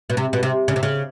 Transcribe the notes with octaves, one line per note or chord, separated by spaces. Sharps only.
B2
C3
B2
C3
C#3
C3
C#3